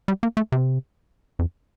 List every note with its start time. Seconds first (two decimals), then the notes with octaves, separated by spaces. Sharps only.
0.08 G3
0.23 A#3
0.37 A3
0.52 C3
1.39 F2